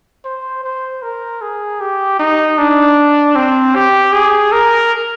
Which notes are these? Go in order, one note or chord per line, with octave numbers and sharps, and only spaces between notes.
C5
C5
A#4
G#4
G4
D#4
D4
C4
G4
G#4
A#4